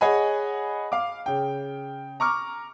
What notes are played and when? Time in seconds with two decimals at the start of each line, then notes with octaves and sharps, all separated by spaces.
0.01 G#4 C#5 D#5 F#5 G#5 B5
0.92 F5 D6
1.26 C#3 G5
2.20 A#5 C#6 D6 F6